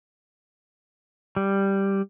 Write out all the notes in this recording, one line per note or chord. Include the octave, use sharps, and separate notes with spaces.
G3